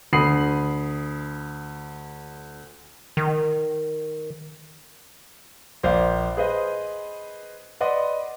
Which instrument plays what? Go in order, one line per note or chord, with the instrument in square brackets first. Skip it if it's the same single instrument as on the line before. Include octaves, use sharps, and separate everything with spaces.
[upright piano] D2 B5 D#6 C7 F#7
[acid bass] D#3
[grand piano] A#1 C5 D5 F5
G#4 B4 C5 D#5
B4 D5 D#5 F#5 B5 C6